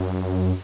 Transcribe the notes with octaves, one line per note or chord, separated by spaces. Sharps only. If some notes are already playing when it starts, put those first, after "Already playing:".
Already playing: F#2